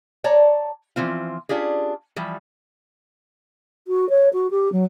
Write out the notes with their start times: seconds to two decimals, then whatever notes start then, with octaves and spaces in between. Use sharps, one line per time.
0.24 C#5 D5 A5 A#5
0.96 E3 F3 C4 F4
1.49 C#4 D4 F4 G4 G#4
2.16 E3 F3 G3
3.87 F#4
4.09 C#5
4.33 F#4
4.51 G4
4.72 F#3